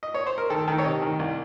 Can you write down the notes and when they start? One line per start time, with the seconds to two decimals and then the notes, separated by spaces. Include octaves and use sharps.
0.03 D#5
0.14 C#5
0.27 C5
0.38 A#4
0.50 D#3 A4
0.68 D#3
0.78 C#5
0.85 C3 D#5
1.02 D#3
1.19 C2